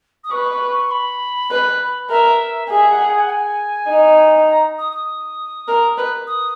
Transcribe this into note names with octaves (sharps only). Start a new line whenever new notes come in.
D#6
B4 C#6
C#6
C#6
B5
B4
A#4 E5
G#4 E5
F#5
G#5
F#5
G#5
D#4
A#5
D#6
D#6
A#4
B4
D#6